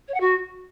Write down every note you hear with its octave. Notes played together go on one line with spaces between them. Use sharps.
C#5
F#5
F#4